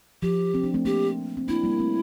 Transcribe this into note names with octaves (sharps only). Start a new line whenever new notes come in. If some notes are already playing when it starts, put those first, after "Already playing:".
F3 G4
C4
D4
A3 C4
A#3 D4 G4
C4
A#3 D4 E4
G3 A#3
A3 C4